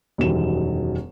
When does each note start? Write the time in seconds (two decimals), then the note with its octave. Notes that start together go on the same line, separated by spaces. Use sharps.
0.18 E1 F#2 D#3 F#3 G3 E7